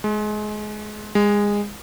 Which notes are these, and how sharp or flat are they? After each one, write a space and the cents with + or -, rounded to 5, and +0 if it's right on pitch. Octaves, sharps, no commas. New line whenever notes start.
G#3 +25
G#3 -20